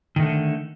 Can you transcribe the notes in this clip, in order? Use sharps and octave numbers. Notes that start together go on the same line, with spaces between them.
D3 D#3 A3